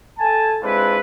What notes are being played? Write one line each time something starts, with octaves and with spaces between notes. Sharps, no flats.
A4 G#5 A5
G#3 C4 D4 E4 F4 B4